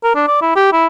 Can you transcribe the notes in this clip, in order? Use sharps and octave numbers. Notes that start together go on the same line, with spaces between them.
A#4
D4
D5
E4
G4
E4